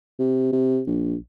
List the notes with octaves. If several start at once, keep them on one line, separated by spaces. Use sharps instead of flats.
C3
C3
A#1